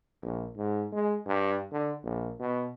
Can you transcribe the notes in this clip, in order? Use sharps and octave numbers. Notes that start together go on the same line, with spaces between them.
A#1
G#2
G#3
G2
D3
A#1
B2